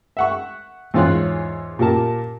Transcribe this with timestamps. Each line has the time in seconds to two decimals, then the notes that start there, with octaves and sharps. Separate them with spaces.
0.17 E5 F#5 C#6
0.94 E2 G#2 F4 C#5 F#6
1.79 A#2 G4 A#4 A5